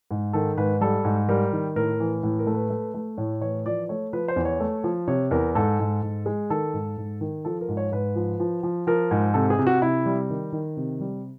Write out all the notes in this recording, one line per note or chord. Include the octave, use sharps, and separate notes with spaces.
G#2
D#3 A4
G#2 B4
G3 A4
G#2
G3 A#4
D#3
A2 A#4
E3
A2
A#4
A3
B4
A3
A3
A2 C#5
E3 C#5
F3 D5
A3 C#5
F3 B4
C5
E2
C#5
A3
F3
C3 C#5
E2 A#4
G#2 A4
G#2
G#2
G#3
D#3 A4
G#2
G#2
D#3
F3 A4
A#4
G#2
C#5
G#2 B4
F3
F3
F3
F3 A#4
G#2
C3 A4
G#4
C3
F#4
C3 E4
G3
D#3
D#3
C3
G3